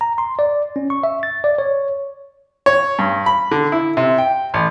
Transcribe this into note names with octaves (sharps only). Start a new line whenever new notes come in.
A#5
C6
D5
C#4
C#6
E5
A6
D5
C#5
C#5
G2
B5
D3
E4
C3
G5
A1